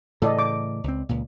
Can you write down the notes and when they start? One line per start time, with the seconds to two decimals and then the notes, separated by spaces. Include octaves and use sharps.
0.22 A2 C#3 E3 A4 D5 D#5
0.39 D6
0.84 C#2 C4
1.09 C#2 A#2